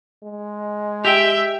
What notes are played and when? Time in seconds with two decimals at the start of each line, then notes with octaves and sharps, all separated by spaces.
0.23 G#3
1.05 G4 E5 G5